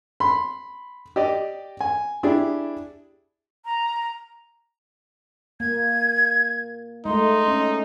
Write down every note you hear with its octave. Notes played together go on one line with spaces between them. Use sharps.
B5 C6
G4 D5 D#5
G#5
D4 E4 G4 G#4
A#5
A#3 G#6
G#3 A3 D#4 C6
C#4